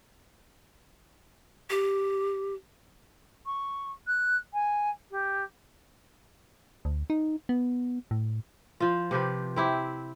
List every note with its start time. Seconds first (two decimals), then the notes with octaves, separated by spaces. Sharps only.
1.70 G4
3.46 C#6
4.07 F#6
4.53 G#5
5.11 G4
6.85 D2
7.10 D#4
7.49 B3
8.11 A2
8.80 F3 F4
9.11 C3 F3 G4 B4
9.56 C4 E4 G4